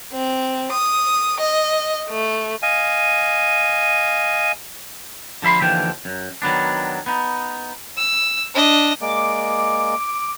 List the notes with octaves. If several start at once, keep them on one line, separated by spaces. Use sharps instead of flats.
C4
D#6
D#5
A3
D#5 F5 G#5
D3 F3 E5 B5 C6
D#2 D3 E3 F3 G5
F#2
D#3 F#3 B3 D4
B3 D#4
E6
D4 D#5
G#3 A#3 D5 D6